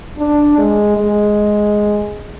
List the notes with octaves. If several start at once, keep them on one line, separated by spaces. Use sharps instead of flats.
D4
G#3
G#3